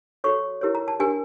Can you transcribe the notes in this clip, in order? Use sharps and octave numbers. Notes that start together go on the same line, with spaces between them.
F#4 A4 C#5 C#6
E4 G4 A#4 C#5
A#5
A5
D4 G4 A#4 G#5